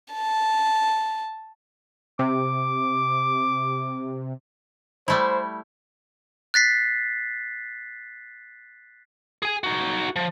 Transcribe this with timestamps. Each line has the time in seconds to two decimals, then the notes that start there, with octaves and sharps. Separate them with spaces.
0.14 A5
2.19 C3 D6
5.08 G3 A3 E4 C5
6.54 F#6 A6 B6 C7
9.42 G#4 G#5
9.63 D#4 F#4
10.16 F3